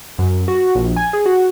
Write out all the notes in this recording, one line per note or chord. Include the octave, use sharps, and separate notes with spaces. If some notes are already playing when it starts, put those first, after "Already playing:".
F#2
F#4
A#1
G#5
G#4
F#4